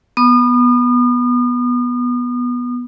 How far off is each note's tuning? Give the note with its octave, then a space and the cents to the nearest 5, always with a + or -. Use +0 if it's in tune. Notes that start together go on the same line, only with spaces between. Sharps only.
B3 -10 D#6 -40